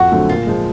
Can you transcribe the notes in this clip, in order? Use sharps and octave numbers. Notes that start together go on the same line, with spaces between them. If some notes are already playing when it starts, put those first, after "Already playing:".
Already playing: F2 F#4
D3 F#3 A3 C4
A#2 F4
F3 G#3